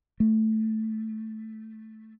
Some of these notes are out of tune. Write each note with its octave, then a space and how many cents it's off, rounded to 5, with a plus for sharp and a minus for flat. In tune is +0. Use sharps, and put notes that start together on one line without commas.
A3 +0